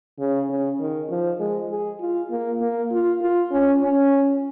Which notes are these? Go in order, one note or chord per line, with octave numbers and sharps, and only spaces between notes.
C#3
C#3
D#3
F3
G#3
G#4
F4
A#3
A#3
F4
F4
C#4
C#4